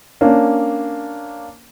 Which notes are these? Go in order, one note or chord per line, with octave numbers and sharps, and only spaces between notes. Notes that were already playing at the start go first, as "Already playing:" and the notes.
A#3 C#4 D4